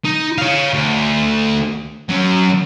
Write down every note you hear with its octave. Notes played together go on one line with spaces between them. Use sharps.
D#4
C#5 F5
D2
F#3 C#4